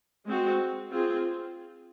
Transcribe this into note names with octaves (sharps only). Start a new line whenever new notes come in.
G#3 C4 F#4
C4 F4 G#4